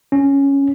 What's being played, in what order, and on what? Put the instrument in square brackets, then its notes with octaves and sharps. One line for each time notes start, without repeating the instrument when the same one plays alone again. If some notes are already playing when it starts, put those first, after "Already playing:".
[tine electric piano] C#4